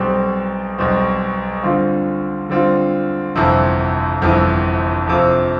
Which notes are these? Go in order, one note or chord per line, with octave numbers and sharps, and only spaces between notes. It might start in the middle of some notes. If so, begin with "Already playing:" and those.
Already playing: B1 B2 G3 C4 G4
B1 B2 G3 C4 G4
D3 G3 C4 F4
D3 G3 C4 F4
G1 F2 C3 E3
G1 F2 C3 E3
F2 C3 F3